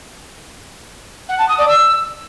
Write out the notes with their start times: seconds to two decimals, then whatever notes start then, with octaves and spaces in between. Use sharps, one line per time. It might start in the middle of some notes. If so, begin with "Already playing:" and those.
1.29 F#5
1.38 A5
1.48 D#6
1.58 D5
1.68 E6